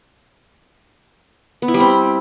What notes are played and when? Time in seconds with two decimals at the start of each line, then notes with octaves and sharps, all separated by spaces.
1.62 B3
1.68 E4
1.74 G3
1.80 C4